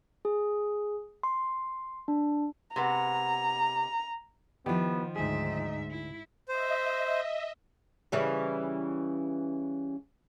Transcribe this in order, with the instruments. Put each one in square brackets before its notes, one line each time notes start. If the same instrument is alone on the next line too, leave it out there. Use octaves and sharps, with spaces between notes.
[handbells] G#4
C6
D4
[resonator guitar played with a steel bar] C3 G#3 B3 [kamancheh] A#5
[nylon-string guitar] D#3 F3 [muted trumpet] B3 [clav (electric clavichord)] E4 G4
[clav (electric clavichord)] D2 G#4 [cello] G#2 E5 [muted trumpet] D#4
[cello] E4
[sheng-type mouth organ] C5 [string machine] D#5 E5
[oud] C#3 E3 G3